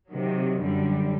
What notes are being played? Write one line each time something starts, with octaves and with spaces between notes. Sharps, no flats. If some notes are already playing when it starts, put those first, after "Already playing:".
C3 D#3 F#3
F#2 D3 G3